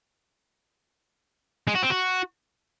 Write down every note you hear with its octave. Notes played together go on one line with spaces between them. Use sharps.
G#3
F#4
C4
F#4